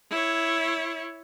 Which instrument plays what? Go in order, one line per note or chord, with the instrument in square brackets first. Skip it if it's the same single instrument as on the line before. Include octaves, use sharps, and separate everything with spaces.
[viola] E4 C#5